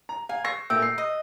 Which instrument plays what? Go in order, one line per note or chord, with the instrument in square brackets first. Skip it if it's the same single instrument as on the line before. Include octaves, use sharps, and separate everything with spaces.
[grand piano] A#5
[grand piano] F5 [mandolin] G#5
[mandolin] C#6 [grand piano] E6 A#6 C7
[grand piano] A#2 A3 [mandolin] G5 [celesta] E6
[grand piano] C7
[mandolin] D#5